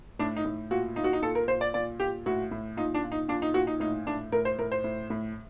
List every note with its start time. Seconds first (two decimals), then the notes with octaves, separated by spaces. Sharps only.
0.19 A2 D4
0.36 D#4
0.45 A2
0.71 A#2 F#4
0.96 A#2 D#4
1.04 F#4
1.13 D#4
1.22 A#2 A4
1.35 A#4
1.48 A#2 C5
1.61 D5
1.74 A#2 D5
2.00 A#2 G4
2.26 A2 F#4
2.51 A2
2.77 A#2 D#4
2.94 D4
3.04 A#2
3.12 D#4
3.28 A#2 D4
3.42 D#4
3.54 A#2 F#4
3.67 D#4
3.80 A2 D#4
4.07 A2 D4
4.32 A2 A#4
4.45 C5
4.58 A2 A#4
4.72 C5
4.84 A2
5.10 A2